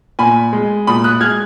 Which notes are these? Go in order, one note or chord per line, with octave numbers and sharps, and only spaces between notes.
A#2 G#5 B5
G#3
A#2 B5 D#6
D#6 F#6
G#3 F6 G#6